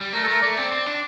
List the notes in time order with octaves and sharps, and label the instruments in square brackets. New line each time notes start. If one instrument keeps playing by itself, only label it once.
[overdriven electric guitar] G3
[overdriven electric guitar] A3 [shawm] A#4
[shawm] A4
[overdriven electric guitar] A3 [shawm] A#4
[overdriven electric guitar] A3 [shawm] D5
[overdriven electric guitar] C4
C4
D4